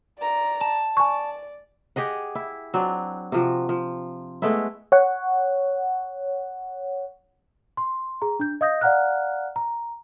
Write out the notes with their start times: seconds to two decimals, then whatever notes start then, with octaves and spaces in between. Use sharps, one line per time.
0.18 D5 A#5
0.61 A5
0.97 D5 G#5 C#6
1.96 G4 G#4 D#5 F#5
2.35 E4
2.74 F#3 C4 D4
3.32 C3 F3 F#4
3.69 F3
4.42 G#3 A3 B3 E4
4.92 C#5 F#5
7.77 C6
8.22 G#4 A#5
8.40 D4 G6
8.61 D#5 F5 D#6 G6 A#6
8.81 D5 F5 F#5 A#5 F6 F#6
9.56 A#5